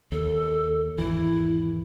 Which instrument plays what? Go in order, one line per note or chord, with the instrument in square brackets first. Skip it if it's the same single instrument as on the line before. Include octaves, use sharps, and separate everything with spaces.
[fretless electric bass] D#2 [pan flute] A4
[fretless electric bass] G#1 E2 E3 [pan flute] E4